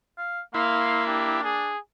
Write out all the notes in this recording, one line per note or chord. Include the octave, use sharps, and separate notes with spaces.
F5
A#3 E4 F5 C6
D4 G4
G#4